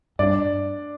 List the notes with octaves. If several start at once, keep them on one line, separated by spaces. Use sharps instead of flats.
G2 D4 D5